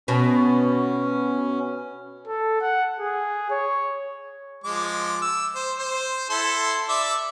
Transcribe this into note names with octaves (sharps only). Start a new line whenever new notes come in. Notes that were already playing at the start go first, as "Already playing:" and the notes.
B2 C#4
A4
F#5
G#4
C#5
F3 G#3 D6
E6
C5
C5
E4 A4 C6
D5 E5 D6